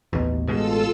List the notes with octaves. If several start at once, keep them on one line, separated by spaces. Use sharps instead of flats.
A1 D#2 B2
A1 B2 G#3 F4 A4 E6